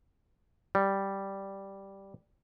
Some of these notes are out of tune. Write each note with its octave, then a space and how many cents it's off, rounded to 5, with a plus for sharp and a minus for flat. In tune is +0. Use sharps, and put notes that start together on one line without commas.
G3 -5